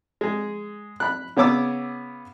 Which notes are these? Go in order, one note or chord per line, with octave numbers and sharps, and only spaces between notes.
G#3 G#4
B5 F#6
C#3 B3 C#5 D6 E6